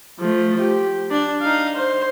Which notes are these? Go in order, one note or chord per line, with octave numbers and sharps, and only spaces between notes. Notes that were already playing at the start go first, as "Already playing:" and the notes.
F3 A3
G4
D4
D#4 F5
C5